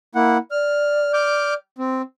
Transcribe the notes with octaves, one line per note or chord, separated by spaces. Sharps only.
A#3 E4 F#5
D5 F6
D6 F6 G6
C4